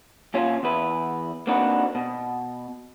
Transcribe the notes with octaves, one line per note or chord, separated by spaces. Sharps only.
A#2 C#4 F4
E2 B4
A#3 C4 D4 D#4 F#4 B4
B2